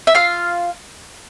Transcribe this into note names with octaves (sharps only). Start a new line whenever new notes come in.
E5
F4 F5